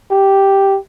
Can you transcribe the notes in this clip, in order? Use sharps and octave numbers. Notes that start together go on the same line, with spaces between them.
G4